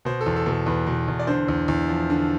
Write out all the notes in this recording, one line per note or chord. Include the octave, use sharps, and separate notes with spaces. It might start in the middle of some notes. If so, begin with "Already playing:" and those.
B2 C5
A4
E2
A4
B2
A4
E2 B4
B2
E2
D5
D3 C5
E2
E2
F3
D3